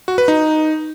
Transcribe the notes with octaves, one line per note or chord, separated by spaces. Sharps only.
F#4
B4
D#4